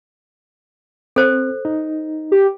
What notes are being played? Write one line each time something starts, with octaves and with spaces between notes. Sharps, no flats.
C4 A4 C5
D#4
G4